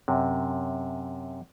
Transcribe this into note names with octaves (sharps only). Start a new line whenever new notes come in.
F#2 C3